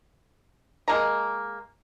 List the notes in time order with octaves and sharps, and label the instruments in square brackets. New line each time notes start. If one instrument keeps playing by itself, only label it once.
[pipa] G#3 A#3 A#5